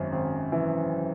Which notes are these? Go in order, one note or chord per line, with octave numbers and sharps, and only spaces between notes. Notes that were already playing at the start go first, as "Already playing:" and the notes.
Already playing: G#1 F#2
G#1
E3